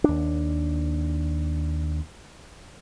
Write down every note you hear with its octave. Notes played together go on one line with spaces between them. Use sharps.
D#2 D4